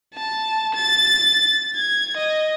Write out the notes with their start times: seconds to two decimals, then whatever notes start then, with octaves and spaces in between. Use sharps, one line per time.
0.14 A5
0.74 A6
1.76 G#6
2.17 D#5